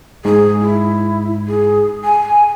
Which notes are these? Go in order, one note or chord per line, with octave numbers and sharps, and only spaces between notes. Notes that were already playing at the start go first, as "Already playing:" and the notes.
G#2 G#4
E4
G#4
G#5